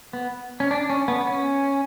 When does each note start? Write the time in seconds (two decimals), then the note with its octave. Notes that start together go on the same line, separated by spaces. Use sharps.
0.13 B3
0.60 C#4
0.71 D4
0.90 C#4
1.08 B3
1.27 C#4